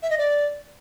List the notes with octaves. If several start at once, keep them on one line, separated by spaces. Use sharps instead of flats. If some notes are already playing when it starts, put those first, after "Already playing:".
E5
D#5
D5